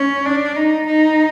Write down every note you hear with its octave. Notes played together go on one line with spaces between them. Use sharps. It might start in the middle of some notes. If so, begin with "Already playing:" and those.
Already playing: C#4
D4
D#4
D#4